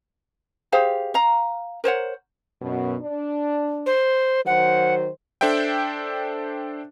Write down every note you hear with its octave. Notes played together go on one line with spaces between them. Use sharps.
G4 G#4 C5 F5
F5 A#5
A#4 C5 C#5 F#5
F#2 B2
D4
C5
D#3 F#3 C5 F#5
D4 A4 C5 E5 G5